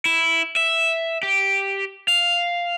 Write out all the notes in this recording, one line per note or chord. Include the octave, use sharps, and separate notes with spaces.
E4
E5
G4
F5